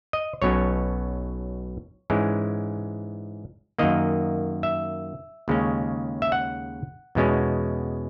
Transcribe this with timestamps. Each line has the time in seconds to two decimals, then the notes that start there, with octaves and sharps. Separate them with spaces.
0.13 D#5
0.42 B1 B2 F#3 C#4 C#5
2.10 G#2 E3 G#3 C#4
3.79 F#2 D#3 A#3 D#5
4.63 E5
5.48 D#2 C#3 G#3 C#4
6.22 E5
6.32 F#5
7.15 E2 B2 G#3 C#4